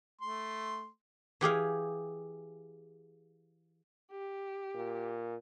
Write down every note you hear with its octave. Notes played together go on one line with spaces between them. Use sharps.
A3 C6
E3 G4 G#4 F5
G4
A#2